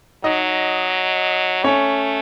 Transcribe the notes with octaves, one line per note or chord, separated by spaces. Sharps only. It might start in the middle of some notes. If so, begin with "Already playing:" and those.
F#3 D#4 D#5
A3 C#4 C#5